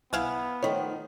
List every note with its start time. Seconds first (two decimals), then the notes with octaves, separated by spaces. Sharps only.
0.13 C2 B3 E4 F5 G#5
0.63 D#3 F3 A3 D#4 C#5